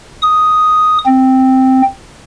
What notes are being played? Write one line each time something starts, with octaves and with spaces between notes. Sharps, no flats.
D#6
C4